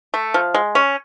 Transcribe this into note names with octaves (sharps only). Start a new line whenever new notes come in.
A3
F3
G#3
C#4